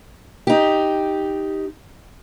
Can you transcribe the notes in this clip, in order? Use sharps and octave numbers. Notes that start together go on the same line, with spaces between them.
D#4 G4